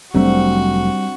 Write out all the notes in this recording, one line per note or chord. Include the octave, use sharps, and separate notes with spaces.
F1 F#3 G3 A3 C4 D4 F#4